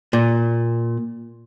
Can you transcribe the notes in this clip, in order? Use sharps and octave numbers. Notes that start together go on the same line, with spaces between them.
A#2